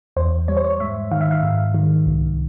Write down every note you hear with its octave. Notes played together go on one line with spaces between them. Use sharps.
E2 C5
G3 C#5
C5
C#5
G#2 E5
D#3 F5
E5
F5
G#2
D#3
C2